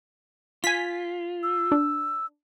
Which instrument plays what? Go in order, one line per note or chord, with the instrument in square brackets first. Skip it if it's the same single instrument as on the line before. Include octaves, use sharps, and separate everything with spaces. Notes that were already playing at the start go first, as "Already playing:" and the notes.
[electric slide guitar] F4 [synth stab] G#5 B6
[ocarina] E6
[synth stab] D4